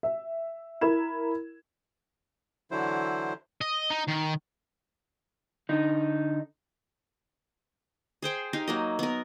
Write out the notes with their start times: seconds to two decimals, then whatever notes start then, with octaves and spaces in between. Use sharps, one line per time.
0.03 E5
0.81 E4 A#4 B5 G#6 E7
2.71 D3 E3 F#3 E4 C5
3.61 D#5
3.90 D#4
4.07 D#3
5.69 D3 D#4
8.22 G#4 C5 G5 C6
8.53 D#4 G4 F5
8.68 F#3 A#3 D#5
8.99 B3 A#4